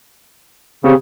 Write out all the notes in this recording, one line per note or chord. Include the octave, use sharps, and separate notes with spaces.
C#3 C4 G4